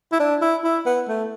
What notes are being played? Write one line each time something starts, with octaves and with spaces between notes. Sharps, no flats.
E4
D4
E4
E4
B3
A3